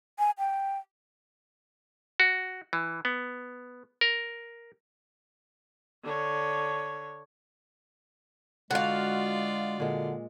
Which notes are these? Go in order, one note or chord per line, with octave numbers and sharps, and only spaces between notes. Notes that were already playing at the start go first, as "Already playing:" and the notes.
G#5
G5
F#4
E3
B3
A#4
D3 C#5
D3 G#3 F4 F#4 D5 F5
A#2 D3 G#3